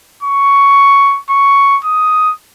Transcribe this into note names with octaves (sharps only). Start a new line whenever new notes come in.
C#6
C#6
D#6